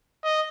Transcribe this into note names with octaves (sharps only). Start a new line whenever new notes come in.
D#5